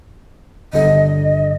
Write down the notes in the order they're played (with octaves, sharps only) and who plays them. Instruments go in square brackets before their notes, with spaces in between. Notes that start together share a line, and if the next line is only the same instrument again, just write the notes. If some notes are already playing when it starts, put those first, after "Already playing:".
[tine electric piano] G1 G2 D3 [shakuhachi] D#5